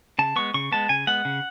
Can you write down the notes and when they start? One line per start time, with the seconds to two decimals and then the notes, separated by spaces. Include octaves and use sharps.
0.19 C#3 A5
0.36 G#3 B3 C#6
0.54 C#3 C#6
0.72 G#3 B3 A5
0.89 C#3 G#5
1.07 G#3 B3 F#5
1.25 C#3